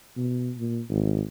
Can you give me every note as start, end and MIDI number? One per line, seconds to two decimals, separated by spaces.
0.17 0.52 47
0.57 0.81 46
0.90 1.24 32